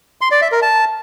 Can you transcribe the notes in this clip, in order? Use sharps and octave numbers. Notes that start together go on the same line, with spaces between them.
C6
D5
E5
A#4
A5